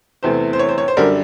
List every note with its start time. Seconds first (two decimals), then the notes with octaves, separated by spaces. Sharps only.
0.23 E2 C3 E3 A3 C5
0.53 C5
0.59 C#5
0.69 C5
0.78 C#5
0.88 C5
0.97 F#2 D3 G3 A#4